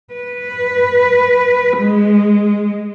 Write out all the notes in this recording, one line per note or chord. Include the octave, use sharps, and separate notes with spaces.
B4
G#3